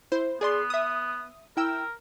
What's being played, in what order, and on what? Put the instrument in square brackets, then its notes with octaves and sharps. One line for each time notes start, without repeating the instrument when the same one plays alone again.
[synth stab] E4 C5
[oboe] B3 [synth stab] G#4 D5 C6
[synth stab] E5 D#6
[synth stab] E4 G5 E6 [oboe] A#4